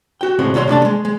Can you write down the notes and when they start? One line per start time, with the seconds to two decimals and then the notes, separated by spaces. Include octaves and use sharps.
0.21 F#4 G5
0.39 A2 C#3 G#3 C4 F#4
0.54 C2 A#2 F#4 C#5 C6
0.68 C3 A3 D4 A5
0.82 G#3 A3
1.05 G#3